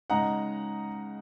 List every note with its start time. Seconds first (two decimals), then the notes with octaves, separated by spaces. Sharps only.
0.10 C#3 G#3 D#4 F#5 A#5